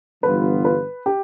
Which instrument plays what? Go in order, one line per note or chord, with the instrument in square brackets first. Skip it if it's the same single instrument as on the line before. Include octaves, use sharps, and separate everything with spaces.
[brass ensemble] G1 G2 E3 B3 F4 [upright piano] B4
[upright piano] B4
G4